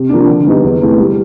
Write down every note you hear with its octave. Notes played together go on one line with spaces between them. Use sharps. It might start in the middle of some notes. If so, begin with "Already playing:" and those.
Already playing: C3
F3 A#3 D4
D3
G3 B3 D#4
E2
C3 E3 A3
G3